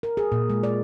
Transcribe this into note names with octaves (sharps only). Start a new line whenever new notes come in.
A#4
G#4
A#2
G#3
D5